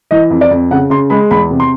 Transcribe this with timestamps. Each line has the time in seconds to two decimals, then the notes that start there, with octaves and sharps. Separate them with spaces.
0.11 E3 D#5
0.30 F2
0.41 D5
0.51 F2
0.71 C#3 F#5
0.90 C#3 C6
1.10 G#3 B5
1.31 E2 B5
1.51 C3
1.60 C6